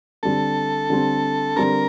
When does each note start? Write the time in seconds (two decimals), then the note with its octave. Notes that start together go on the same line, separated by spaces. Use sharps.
0.23 D3 G3 C4 A4
0.90 D3 G3 C4
1.56 D3 G3 C4 A#4